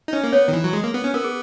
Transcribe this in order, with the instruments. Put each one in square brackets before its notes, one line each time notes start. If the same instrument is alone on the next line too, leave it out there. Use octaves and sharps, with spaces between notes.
[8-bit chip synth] D#4
C#4
A#3
[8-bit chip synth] B3 [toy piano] C#5
[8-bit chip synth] D#3
E3
F#3
G#3
A#3
B3
C#4
[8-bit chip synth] B3 [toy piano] A#4
[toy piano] G#4